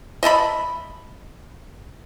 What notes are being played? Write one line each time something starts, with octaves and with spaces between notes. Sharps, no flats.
D#5 E5 A5 B5